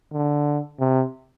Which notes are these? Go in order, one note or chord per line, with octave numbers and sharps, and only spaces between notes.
D3
C3